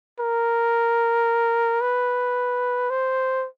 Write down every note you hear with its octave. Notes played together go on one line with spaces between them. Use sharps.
A#4
B4
C5